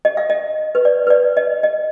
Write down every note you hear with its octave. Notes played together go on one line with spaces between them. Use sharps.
D#5
F5
D#5
B4
D5
B4
D5
D#5
D#5